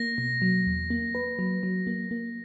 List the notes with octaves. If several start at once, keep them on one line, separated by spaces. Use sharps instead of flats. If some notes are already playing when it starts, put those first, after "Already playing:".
Already playing: A#3 A#6
B2
F#3
E2
A#3
B4
F#3
F#3
A#3
A#3